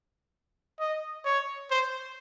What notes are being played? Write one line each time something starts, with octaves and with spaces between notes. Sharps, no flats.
D#5
C#5
C5